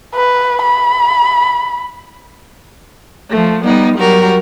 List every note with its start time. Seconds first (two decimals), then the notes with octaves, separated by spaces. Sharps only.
0.14 B4
0.62 B5
3.30 F3 A3
3.64 G3 B3 D#4
3.96 F#3 G3 F#4 A#4